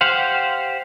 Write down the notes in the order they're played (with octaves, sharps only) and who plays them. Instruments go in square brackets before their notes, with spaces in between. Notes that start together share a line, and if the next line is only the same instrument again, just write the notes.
[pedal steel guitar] G4 C5 F5 F#5